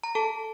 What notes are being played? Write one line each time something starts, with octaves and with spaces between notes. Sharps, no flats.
A#5
A4 A5